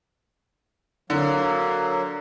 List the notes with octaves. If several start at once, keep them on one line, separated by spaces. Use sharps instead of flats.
D3 F#3 A#3